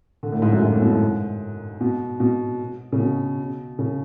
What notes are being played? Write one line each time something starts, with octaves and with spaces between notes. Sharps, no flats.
D3
A2
G#2
F#2
G#2
A2
B2
G#2
B2
B2
C#3
B2
C#3